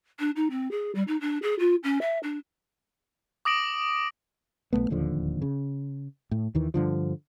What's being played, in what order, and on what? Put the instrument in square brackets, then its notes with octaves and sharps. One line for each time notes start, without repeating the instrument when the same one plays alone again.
[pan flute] D4
D#4
C4
G#4
G3
D#4
D4
G#4
F4
C#4
E5
D4
[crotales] D6 D#6 A#6 D7 F#7
[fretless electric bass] B1 G2 A3 B3
D1 D#2 D3 F3
C#3
A2
D#2 D#3 E3
G2 D3 F3